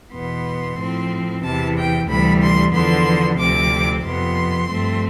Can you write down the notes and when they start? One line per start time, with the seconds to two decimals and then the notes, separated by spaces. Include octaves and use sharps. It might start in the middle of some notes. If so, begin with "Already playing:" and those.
0.14 E2 B2 B3 C6
0.79 A2 F3 C4
1.44 E2 C3 E3 A5
1.77 G5
2.09 D2 C3 E3 G3 B5
2.42 C6
2.74 E2 D3 F3 B3 C6
3.39 D2 C3 F3 C4 D6
4.04 F2 C3 F3 B3 C6
4.70 G2 F3 A3 C4